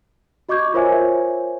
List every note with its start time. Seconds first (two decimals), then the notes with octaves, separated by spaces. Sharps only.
0.49 F#4 D#5 C#6 D6 G6 G#6
0.74 F4 A#4 C5 C#5 E5 G#5